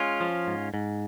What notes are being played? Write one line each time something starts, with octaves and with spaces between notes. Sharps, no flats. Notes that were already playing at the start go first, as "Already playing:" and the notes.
Already playing: G#3 C#4 F4
F3
G#2
G#2